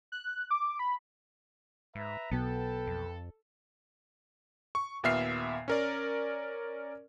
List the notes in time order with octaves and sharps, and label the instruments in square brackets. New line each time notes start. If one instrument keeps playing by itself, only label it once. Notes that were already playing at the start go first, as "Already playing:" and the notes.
[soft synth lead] F#6
D6
B5
[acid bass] G#2 [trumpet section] B4 E5 A#5
[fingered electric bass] B1 B2 [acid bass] B3 [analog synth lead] A4 [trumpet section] B4 G5 A5
[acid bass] F2
[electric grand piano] C#6
D#2 A#2 B3 E5 F6 C7
C#4 A#4 D5